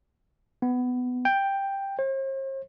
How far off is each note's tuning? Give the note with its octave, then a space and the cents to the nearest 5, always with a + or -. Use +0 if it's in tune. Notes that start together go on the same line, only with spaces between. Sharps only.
B3 +15
G5 +5
C5 +45